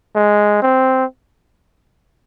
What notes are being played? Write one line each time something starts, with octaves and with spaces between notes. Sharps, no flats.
G#3
C4